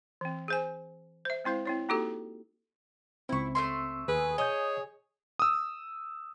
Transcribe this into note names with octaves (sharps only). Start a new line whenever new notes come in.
E3 C4
G#4 C5 G#5
C5 E5
G#3 C4 E4 C5 F5
C4 E4 C#5
A#3 D#4 F#4 G4 A4
C#2 C4 E4 C#6
A3 E5 C6
D#2 G#4 B4
C#5 D#5 G#5 D#6 G6
D#6 E6